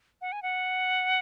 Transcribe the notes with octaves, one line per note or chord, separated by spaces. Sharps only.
F#5
G#5
F#5